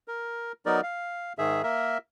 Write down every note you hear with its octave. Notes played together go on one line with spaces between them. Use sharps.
A#4
F#3 B3 D#4 A#4 D5
F5
G#2 D#3 G#4 E5
A#3 A#4 E5